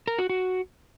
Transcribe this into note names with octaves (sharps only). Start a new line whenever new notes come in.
A#4
F#4
F#4